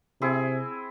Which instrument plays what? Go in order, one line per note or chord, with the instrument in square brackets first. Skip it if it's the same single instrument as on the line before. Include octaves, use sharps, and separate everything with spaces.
[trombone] C3 [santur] C4 E4 G#4